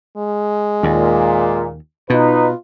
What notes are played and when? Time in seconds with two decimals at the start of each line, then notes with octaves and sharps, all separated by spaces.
0.17 G#3
0.83 D#2 A#2
2.10 B2 D#4 F4 B4